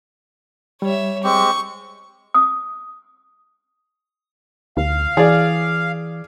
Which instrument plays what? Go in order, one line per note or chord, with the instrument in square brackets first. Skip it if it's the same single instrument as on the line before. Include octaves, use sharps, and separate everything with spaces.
[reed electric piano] G3 [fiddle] C#5 E5
[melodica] G#3 C4 G4 [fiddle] C#6
[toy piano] D#6
[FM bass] D2 [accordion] F5
[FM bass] E3 [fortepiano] G#4 D5